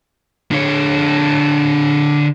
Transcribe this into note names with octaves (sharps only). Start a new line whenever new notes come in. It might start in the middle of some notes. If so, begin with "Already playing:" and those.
D3 C#5